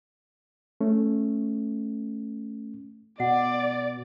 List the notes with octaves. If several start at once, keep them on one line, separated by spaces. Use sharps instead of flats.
A3 C#4
B2 D5 F#5